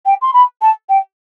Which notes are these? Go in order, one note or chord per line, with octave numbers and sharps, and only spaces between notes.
G5
C6
B5
A5
G5